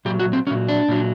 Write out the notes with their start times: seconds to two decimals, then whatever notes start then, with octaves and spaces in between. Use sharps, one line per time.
0.05 A#2 F#3 G4
0.20 F#4
0.33 C4
0.47 F#3 C#4
0.51 A#2
0.69 D4
0.88 A#2 F#3